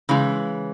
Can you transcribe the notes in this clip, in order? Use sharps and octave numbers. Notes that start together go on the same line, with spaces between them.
C#3 E3 G#3